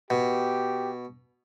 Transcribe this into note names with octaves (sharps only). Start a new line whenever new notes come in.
B2 G4